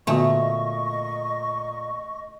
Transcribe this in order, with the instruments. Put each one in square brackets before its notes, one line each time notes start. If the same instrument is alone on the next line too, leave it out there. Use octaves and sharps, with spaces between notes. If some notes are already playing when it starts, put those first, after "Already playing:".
[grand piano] A#2 [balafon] D3 B3 F#4 [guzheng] A3 [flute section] D#5 C#6